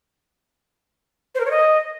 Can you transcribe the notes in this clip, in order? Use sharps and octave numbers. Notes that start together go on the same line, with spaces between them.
C5
A#4
C#5
D#5